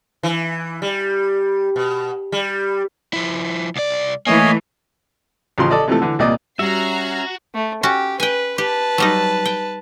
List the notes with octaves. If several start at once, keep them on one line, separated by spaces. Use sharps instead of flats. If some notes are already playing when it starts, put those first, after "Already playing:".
E3
G3
B2
G3
F3 E4
C2 D5
E3 A3 A#3 C#5 D#5 G#5
A1 C#3 F3 C6
A4 D5 D#5
C3 E3 F3 A3
D3 E3
C2 A#2 D5 D#5
G3 C#4 F#4 E5 A#5 C7
A3
C#4 F#4 G4
B4 G5 G#5
G4 B4 A5
F#3 G3 D#4
G5